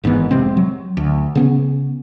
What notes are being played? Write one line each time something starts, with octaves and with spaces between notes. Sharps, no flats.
G#1 G#2 E3 B3
F1 C3 G#3 C4
F#3
D2
C#3 B3 C#4